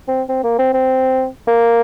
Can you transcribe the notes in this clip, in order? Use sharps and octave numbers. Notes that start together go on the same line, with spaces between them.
C4
C4
A#3
C4
C4
A#3